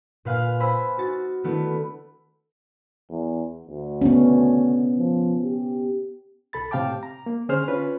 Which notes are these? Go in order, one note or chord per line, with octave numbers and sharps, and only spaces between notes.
A#2 B4 F5 G#5 F#6
C5 G#5 B5 E6
D#4 F#4 A6
D#3 A3 B3 D4 E4
E2
D2
B3 C#4
F3
G4
C2 A4 B5 A6
A2 C3 F5 G5 A5 D6
A#5
A#3
D3 C#4 G#4 C5 C6 F6
C#4 F4 B4